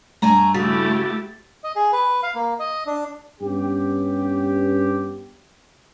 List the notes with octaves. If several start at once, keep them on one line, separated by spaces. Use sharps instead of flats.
G2 A3 G#5 A#5
C#3 A3 E4 F#4 G4 A6
D#5
G#4
B4
F5
A#3
D#5
D4
G2 B3 C#4 G4